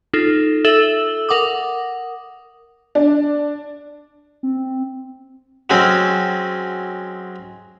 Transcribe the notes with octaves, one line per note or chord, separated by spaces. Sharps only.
D#4 F4 A4
A4 E5 E6 F#7 G7
A#4 F#5 D6 D#6
D4
C4
F#3 G#3 C4 C#4